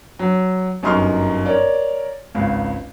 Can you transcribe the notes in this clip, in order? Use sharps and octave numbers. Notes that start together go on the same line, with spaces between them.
F#3
G1 F#2 D#4 C6 C#6 F6
A#4 C#5 D5
G#1 C#2